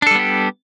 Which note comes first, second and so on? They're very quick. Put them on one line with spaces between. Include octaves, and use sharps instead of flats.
D4 A4 G3 B3 G4